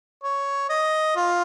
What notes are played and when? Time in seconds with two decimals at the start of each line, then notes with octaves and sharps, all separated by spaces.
0.24 C#5
0.69 D#5
1.16 F4